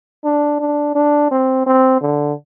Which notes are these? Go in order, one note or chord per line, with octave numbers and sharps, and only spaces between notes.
D4
D4
D4
C4
C4
D3